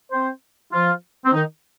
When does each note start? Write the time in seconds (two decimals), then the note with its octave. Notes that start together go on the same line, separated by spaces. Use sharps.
0.12 C4 C5
0.72 F3 F4
1.25 C4
1.34 D#3 D#4